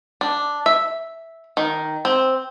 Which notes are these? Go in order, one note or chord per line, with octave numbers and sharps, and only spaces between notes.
D4
E5
D#3
C4